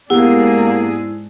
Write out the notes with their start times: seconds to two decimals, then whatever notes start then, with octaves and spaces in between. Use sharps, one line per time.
0.10 G#2 A#3 B3 D4 E4 G4 G#4 F#5